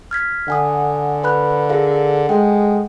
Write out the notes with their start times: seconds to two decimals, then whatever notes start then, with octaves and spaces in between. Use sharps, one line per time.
0.11 F6 G#6 B6
0.48 D3 F#5 G#5 D#6
1.24 B4 B5 F#6
1.69 G#4 A#4 F5
2.29 G#3 A4 F#5 G5